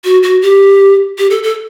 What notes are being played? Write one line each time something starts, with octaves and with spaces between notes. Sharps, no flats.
F#4
F#4
G4
G4
A4
A4